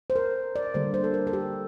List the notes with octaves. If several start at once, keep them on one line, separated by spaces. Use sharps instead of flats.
C5
A#4
D5
D3 G3 A#3 C5
C5
A4
A#4
A4
G4